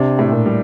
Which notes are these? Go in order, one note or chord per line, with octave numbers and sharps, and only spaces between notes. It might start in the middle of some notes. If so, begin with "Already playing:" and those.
Already playing: C3 D4
A2
A#2
G3